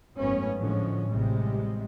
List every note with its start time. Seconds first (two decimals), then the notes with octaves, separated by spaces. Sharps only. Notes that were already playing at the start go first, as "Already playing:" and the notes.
0.15 G#1 F#2 A3 B3 C#4
0.57 A2 D3 F3 G#3 C#4
1.08 A1 C3 G3 G#3